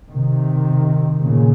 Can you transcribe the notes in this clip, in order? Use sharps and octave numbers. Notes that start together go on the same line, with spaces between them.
C3 D#3
A#2 C#3